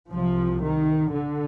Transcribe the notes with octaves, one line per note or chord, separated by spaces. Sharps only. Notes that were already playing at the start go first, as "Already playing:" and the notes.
C2 C3 F3
D#3
D3